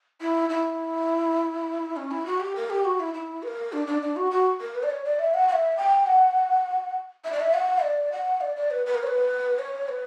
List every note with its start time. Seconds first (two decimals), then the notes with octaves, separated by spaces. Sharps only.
0.21 E4
0.50 E4
1.96 C#4
2.11 E4
2.26 F#4
2.40 G4
2.56 A#4
2.70 G4
2.85 F#4
3.00 E4
3.14 E4
3.43 B4
3.47 A#4
3.73 D4
3.87 D4
4.02 D4
4.16 F#4
4.31 F#4
4.60 A#4
4.75 B4
4.83 D5
4.90 C#5
5.05 D5
5.19 E5
5.34 F#5
5.48 F#5
5.53 E5
5.77 G5
6.07 F#5
7.25 E5
7.32 D5
7.40 E5
7.54 F#5
7.83 D5
8.12 F#5
8.41 D5
8.56 D5
8.71 B4
8.86 B4
8.95 A#4
9.03 C#5
9.07 B4
9.59 C#5
9.88 B4